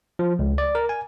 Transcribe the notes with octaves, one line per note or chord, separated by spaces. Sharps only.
F3
C#2
D5
A#4
G#5